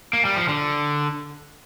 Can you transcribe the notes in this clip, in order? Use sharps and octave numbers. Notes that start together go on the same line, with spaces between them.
A#3
G3
F3
D3